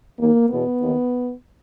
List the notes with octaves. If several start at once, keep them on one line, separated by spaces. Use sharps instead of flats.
D#2 D#3 A#3
E2 B2 B3
D#2 D#3